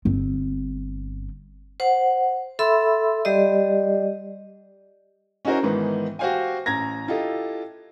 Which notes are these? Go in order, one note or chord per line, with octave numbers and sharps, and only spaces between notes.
G1 C4
C5 F#5
A4 E5 B5 C6 E6
G3 G4 D5 D#5
C#4 D#4 E4 F#4 A#4 C5
G#2 D#3 E3 B3
F#4 G4 C5 F5 G5 G#5
A1 A#5 G#6 A#6
E4 F4 G4 A4 D#5